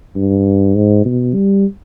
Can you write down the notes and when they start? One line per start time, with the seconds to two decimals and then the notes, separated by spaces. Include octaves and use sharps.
0.16 G2
0.75 G#2
1.05 B2
1.34 G3